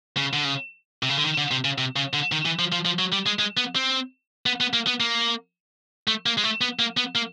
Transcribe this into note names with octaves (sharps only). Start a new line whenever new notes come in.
C#3
D3
C#3
C3
C#3
D3
D#3
D3
C3
C#3
C3
C#3
D3
D#3
E3
F3
F3
F3
F#3
G3
G#3
G#3
B3
C4
B3
B3
A#3
B3
A#3
A3
A#3
G#3
A3
B3
A#3
B3
A#3